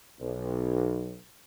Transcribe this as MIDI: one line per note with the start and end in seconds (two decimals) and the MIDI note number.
0.20 1.18 35